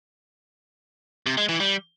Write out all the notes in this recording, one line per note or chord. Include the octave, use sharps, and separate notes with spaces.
C3
G#3
E3
G3